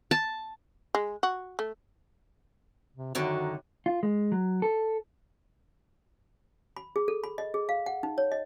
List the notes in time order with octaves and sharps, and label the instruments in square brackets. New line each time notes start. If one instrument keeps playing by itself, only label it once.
[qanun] A5
[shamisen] G#3
F#4
A3
[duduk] C3
[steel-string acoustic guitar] F#2 D3 D#3 [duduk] F#4
[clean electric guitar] F4
G#3
F#3
A4
[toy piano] B5
G#4
A4
B5
D#5
G#4
F5
F#5
D#4
C#5
D#5